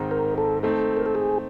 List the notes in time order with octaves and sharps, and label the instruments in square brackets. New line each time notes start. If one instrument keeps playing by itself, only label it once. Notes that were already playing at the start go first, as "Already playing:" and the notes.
Already playing: [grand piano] G#2 D#3 G#3 C4 D#4
[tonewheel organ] A#4
A4
[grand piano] A3 C4 D#4 [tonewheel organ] A4
[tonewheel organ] A#4
A4
G#4